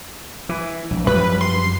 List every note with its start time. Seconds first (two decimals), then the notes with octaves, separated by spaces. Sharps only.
0.49 E3
0.91 A#1
1.07 F#2 F3 G3 B4
1.41 C6